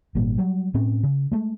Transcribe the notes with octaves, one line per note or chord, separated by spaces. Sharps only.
G#1 A#2 G3
F#3 G3
A2 C4 C#4
C#3
G#3 A3